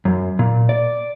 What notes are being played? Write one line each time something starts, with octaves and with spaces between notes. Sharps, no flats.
F#2
A#2
D5